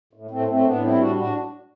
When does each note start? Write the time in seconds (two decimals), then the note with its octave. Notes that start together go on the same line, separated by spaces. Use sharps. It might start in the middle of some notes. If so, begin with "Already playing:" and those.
0.13 A2
0.31 A2 A3 C4
0.48 A2 A3 C4
0.65 A2 B3 D4
0.82 G3 C4 E4
0.98 A2 D4 F#4
1.16 A2 D4 F#4